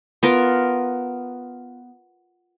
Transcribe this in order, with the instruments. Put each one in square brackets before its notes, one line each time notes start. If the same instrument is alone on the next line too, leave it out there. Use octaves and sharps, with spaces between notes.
[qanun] B3 F4 A#4